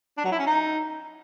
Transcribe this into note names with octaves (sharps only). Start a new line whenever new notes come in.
D4
F#3
E4
C#4
D#4